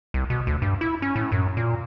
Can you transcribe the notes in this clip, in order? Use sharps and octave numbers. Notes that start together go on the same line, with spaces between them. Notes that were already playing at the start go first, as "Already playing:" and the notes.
C2
B2
D2
G2
E4
C#4
A2
F#2
A#2